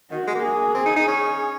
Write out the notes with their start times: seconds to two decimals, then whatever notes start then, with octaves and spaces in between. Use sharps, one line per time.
0.11 D#3 F#4
0.27 G#3
0.35 A#3
0.44 G#4
0.75 C4
0.86 D#4
0.96 D#4
1.08 C#4